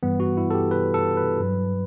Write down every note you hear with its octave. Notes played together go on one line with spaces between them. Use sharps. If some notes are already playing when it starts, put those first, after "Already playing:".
G2 E3 G3 B3
F#4
E4
A4
G4
B4
A4
B4
G2 F#3